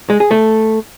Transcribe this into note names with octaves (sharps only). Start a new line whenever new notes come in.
G#3
G#4
A3